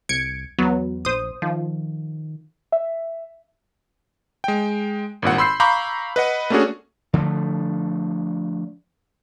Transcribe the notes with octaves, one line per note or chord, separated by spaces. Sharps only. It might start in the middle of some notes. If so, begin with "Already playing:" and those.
C2 G#6 C#7 D7
E2 F#3 B3
A#1 C5 D#6
D#3 F3
E5
G#3 G5
G#1 G2 A#2 F#5
B5 C6 E6 G6 C7
F5 A#5 B5 C#6 D6 G6
B4 D#5 F#5
A3 A#3 C#4 D4 F#4 G#4
D3 F3 A3